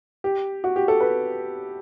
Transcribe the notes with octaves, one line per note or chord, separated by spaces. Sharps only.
G4
F#4
G4
A4
B4